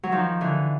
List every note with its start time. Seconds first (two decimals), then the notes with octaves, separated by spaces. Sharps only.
0.03 F#3
0.12 D#3 F3
0.41 D3 E3